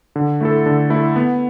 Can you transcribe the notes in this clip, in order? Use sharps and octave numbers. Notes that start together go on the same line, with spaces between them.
D3
A3 E4 A4
D3
A3 E4 A4
B3